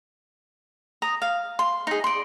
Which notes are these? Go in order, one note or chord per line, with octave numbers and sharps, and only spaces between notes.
A#5 D#6
F5
C6
D#4 G#4
D5 C6